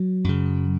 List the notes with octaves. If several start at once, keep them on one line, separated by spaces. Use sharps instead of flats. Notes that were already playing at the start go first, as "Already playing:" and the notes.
Already playing: F#3
F#2 C#3